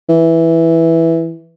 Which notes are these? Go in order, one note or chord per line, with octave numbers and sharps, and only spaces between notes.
E3